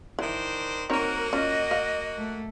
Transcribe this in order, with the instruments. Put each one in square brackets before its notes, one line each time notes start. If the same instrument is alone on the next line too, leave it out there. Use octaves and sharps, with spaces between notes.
[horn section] D#3 D4 C5 [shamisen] E3
[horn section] A#3 F#4 F#5 [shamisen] C4 D#4 C#5 [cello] A#4
[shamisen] C#4 F4 [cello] D#5
[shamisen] F5
[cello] A3